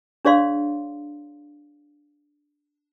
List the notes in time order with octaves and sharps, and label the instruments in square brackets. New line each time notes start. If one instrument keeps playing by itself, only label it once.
[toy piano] D4 G#4 C#5 D5 F5 C6